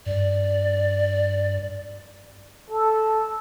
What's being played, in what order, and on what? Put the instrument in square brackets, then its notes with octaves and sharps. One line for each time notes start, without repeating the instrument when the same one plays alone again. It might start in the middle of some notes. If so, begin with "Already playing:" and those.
[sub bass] G2 [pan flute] D5
[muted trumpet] A4